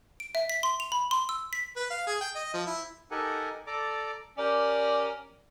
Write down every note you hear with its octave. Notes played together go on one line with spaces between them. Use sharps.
D7
E5
B6
C6
F7
B5
C6
E6
B6
B4
F5
G#4
G5
D#5
F3
E4
D#4 G4 A4 A#4 F#5 G#5
A4 D5 A#5 D6
C#4 G4 A#4 D5